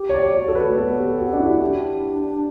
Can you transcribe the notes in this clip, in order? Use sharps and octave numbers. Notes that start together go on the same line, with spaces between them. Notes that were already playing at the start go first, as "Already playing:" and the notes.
Already playing: G4
C#5
D5
F#4 C#5
A4
B4
A3
B3 A4
G4
F#4
A4
D4 G4
E4 F#4
E4
D4 G4